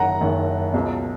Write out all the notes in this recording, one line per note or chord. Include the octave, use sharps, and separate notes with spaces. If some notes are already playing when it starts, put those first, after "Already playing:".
Already playing: F#1 F#2 D#3 F#5 A#5
F#1 F#2 D#3
C#2 B2